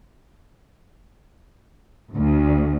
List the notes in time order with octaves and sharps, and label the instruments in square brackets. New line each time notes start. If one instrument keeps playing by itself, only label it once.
[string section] D2